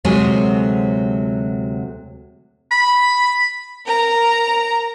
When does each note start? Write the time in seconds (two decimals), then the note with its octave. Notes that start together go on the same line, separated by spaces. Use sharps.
0.04 D2 C3 F#3 G#3 G#4 C#5
2.71 B5
3.86 A#4 A#5